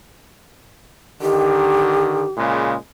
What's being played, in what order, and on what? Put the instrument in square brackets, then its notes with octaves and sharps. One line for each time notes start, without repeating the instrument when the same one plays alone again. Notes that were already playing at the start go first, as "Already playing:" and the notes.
[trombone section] D3 D#3 [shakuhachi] G4
[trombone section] A#2 C#3 G#3